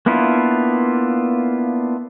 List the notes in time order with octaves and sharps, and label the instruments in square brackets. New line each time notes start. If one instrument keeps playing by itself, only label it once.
[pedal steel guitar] A#3 B3 D4 E4 F4